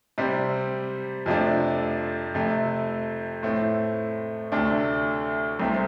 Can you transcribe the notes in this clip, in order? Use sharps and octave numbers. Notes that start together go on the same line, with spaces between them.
C3 G3 C4
F2 C3 F3 A3 D4
F2 C3 A3
A2 A3 C4
D2 C3 A3 D4
C2 C3 A3 C4